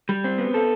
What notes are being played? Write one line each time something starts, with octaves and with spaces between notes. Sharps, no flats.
G3
C4
B3
A4